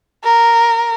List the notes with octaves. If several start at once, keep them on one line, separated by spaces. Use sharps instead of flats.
A#4